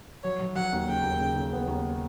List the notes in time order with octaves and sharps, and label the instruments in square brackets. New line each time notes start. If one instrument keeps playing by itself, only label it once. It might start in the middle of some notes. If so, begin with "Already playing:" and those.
[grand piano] F#3 [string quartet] C#5
[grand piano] F#3
[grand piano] F#3 [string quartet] F#5
[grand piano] D#2
[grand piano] C#3 [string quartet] G5
[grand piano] D#2
C#3
C#3
B3
D#2